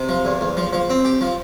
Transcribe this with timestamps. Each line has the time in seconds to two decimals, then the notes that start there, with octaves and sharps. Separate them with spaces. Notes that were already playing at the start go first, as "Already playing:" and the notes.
Already playing: C3
0.09 F3
0.25 E2
0.41 E2
0.57 F3
0.73 F3
0.90 C4
1.05 G4
1.21 F3